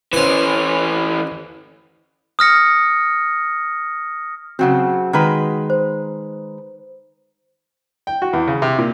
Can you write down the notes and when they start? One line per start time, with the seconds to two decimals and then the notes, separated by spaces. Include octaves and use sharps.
0.13 E3 C#4 B4 C5
2.39 D#6 F6 A#6 C#7
4.59 C#3 F#3 C4 F#4 F#5
5.13 D#3 G#3 B4
5.70 C5
8.07 G5
8.22 F#4
8.33 E2
8.48 C#3
8.62 C3
8.79 A#2